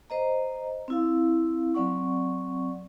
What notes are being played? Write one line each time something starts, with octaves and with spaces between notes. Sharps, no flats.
C5 D#5 A#5
C4 E4 F5
F#3 C4 D5 F#5 C#6